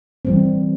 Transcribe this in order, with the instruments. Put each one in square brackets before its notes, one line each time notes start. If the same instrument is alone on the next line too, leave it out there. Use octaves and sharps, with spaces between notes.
[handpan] E3 G3 C4